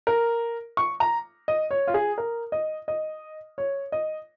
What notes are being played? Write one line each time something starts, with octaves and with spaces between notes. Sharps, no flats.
A#4
C#6
A#5
D#5
C#5
F4
G#4
A#4
D#5
D#5
C#5
D#5